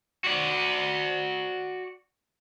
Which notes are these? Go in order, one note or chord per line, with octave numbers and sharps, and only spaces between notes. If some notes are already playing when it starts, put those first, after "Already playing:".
F#4 D5